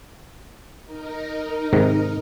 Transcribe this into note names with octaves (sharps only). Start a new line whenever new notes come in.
D#4 A#4
G#2 C3 D#3